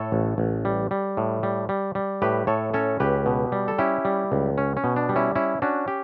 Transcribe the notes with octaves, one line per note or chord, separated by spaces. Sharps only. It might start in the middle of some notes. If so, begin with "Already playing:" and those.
Already playing: A2 A4 C#5
A1
A1
G3
G3
A2
G3
G3
G3
A2 G4 B4
A2 A4 C#5
C#4 A4 C#5
C#2 G4 B4
B2
G3
A4
C#4 E4 G4
G3
C#2
C#4
C#4
B2
D4
G3
C#4 E4
C#4 E4
C#4 D4 F#4
G4